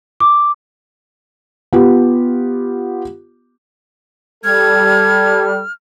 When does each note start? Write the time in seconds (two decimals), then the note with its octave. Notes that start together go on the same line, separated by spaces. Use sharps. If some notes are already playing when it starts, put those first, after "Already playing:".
0.20 D6
1.73 B3 F4 G4
4.44 G3 A4 F6 G#6